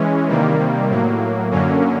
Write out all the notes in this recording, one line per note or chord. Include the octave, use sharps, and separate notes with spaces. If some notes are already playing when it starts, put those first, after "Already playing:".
Already playing: E3 G#3 C#4
C3 D#3 G3 A#3
A2 F#3 A#3
F#2 D3 F#3 A#3 C#4